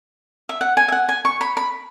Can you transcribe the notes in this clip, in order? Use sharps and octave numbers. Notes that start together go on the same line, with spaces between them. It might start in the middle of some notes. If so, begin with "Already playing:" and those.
E5
F#5
G#5
E5
F#5
G#5
C#6
B5
B5